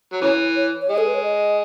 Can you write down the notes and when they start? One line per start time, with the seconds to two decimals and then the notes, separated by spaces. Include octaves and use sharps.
0.13 F#3
0.21 C#3 E3 C#5
0.56 C#5
0.81 C#5
0.89 G#3 D#5
0.98 A4
1.06 B4
1.14 C#5
1.23 D#5